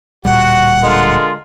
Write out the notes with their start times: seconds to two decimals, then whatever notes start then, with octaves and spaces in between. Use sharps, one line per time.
0.25 D1 A#2 G3 F#4 F#5
0.83 D3 G#3 F4 A#4